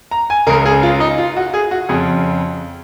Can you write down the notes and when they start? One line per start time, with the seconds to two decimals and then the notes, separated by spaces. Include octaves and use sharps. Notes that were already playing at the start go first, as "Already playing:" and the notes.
0.11 A#5
0.30 G#5
0.47 C#2 C#3 A#4
0.65 G#4
0.83 F4
1.00 D#4
1.18 F4
1.36 F#4
1.54 G#4
1.71 F#4
1.89 F2 C#3 G#4